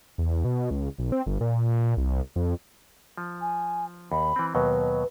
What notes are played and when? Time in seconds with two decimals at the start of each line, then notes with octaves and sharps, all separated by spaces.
0.18 E2
0.45 B2
0.71 C#2
0.98 B1
1.12 C4
1.26 G1
1.41 A#2
1.97 C2
2.36 F2
3.17 F3
3.41 G#5
4.12 D#2 B5
4.36 E3 C4
4.55 D#2 B2 F#3 B4